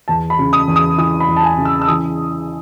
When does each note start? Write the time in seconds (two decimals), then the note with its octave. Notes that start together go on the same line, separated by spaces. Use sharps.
0.08 E2 A5
0.30 B5
0.39 C#3
0.53 D#6
0.68 E2
0.76 D#6
0.98 E3 D#6
1.20 B5
1.28 E2
1.36 A5
1.43 G#5
1.58 C#3
1.65 E6
1.82 E6
1.88 E3 D#6